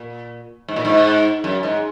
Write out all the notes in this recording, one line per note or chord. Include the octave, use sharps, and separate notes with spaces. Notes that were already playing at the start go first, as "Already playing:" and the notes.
Already playing: A#2
G#2
A#2
G#2
F#2
G#2